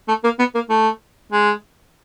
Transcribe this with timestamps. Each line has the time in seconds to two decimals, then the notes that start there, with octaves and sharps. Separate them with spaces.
0.08 A3
0.24 A#3
0.39 B3
0.55 A#3
0.70 A3
1.32 G#3